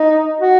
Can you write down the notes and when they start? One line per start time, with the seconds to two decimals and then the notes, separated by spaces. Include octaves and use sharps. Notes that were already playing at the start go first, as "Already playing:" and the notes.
Already playing: D#4
0.40 F#4